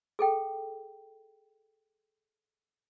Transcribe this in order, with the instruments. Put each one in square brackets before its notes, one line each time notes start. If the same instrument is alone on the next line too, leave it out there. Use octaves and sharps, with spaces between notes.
[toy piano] G#4 A4 G5